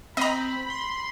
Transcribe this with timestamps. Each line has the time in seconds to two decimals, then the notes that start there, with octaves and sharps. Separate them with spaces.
0.17 C4 D#5 A#5 B5
0.70 C6